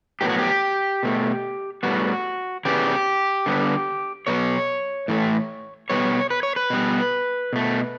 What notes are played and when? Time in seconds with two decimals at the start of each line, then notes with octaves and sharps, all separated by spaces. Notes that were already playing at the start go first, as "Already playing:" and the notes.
0.21 A2 F#3 B3 G4
0.30 F#4
0.39 G4
1.03 B2 A3
1.83 A2 G3 B3 F#4
2.65 C#3 E3 G3 B3 G4
3.46 D3 G3 B3
4.27 B2 F#3 B3 C#5
5.08 A2 E3 A3
5.90 B2 G3 B3 C#5
6.30 B4
6.43 C#5
6.56 B4
6.70 B2 G3 B3
7.53 B2 A3